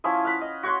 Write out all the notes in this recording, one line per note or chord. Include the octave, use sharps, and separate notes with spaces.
F3 C#4 E4 D#6
F5 F#5 B5
D#5
F#4 C#5 F#5 C6